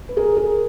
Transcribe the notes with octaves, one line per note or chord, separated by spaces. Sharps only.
B4
G#4 A#4
G#4 A#4